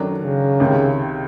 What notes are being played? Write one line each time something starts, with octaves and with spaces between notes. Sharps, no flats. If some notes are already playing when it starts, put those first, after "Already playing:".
Already playing: F#2 D#3 F#3 A3 D4
C#3
C#2 C3 D#3